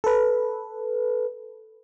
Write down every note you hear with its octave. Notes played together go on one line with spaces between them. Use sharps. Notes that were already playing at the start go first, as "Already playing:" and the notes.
A4 B4